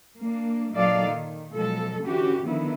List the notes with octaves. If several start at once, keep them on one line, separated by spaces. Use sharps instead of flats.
A#3 D4
A#2 F#3 D#4 A4 D5 F5
D#3
B2 F3 F#3 G#3 A4
D3 E3 C#4 F#4 G4
D3 D#3 F3 B3 E4